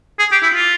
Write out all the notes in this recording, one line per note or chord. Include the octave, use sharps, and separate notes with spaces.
G#4
G4
E4
F4